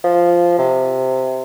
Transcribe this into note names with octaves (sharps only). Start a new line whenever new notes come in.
F3
C3